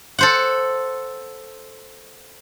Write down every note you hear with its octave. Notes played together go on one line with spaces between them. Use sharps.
A4 C5 F#5